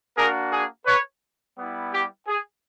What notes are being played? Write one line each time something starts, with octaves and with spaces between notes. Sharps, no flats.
A#3 D4 F#4 G#4 A#4
G#4
B4 C#5
G3 B3 E4
G4
G#4